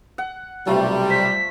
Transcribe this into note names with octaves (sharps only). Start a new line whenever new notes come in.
F#5
B1 C3 G3 A3 F4
C5 B6